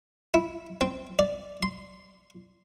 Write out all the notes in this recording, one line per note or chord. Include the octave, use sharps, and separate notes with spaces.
E4
C4
D5
C6